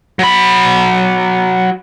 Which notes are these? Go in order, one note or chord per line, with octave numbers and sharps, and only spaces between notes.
F#3 B5